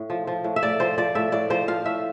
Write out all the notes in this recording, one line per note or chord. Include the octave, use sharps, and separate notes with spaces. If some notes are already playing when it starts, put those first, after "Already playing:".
Already playing: A2
F3
F3
A2
E5
A2 D5
F3 C5
F3 D5
A2 E5
A2 D5
F3 C5
F3 F5
A2 E5